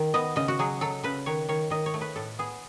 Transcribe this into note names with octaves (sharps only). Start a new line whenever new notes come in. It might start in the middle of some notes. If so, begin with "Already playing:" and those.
Already playing: D#3
B3 D#5
C#3 D#5
F#4
F#3 G#4
F#3 A4
C#3 B4
D#3 C#5
D#3 C#5
D#3 D#5
C#5
A3
B4
A2 A4
B3 G#4